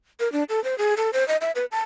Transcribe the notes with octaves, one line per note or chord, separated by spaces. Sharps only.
A#4
D4
A4
C5
G#4
A4
C5
D#5
E5
B4
A5